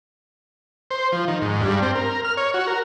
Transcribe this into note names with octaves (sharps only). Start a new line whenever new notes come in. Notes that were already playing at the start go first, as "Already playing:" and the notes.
C5
F3
D#3
G#2
G2
C4
A#4
F6
C#5
F#4
A#4